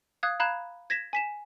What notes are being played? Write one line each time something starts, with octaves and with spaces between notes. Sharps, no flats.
F5 D#6 F#6 G#6
F5 A#5 B5 F#6 G#6 E7
G#6 A#6 B6 E7
G#5 B6 E7